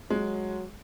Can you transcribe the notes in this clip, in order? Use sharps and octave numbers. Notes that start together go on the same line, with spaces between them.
F#3 G#3